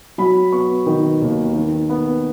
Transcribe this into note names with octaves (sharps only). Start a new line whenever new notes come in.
F#3 B5
B3 C#6
D#3
D#2
D#3
B3